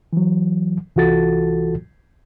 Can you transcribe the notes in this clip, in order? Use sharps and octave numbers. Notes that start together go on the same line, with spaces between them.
E3 F#3
C2 E3 F4 F#4 A4 A6